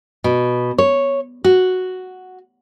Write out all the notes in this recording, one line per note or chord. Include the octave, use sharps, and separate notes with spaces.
B2
C#5
F#4